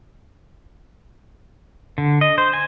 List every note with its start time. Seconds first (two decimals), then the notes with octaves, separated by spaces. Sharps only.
1.98 D3
2.21 D#5
2.38 C5
2.54 G#5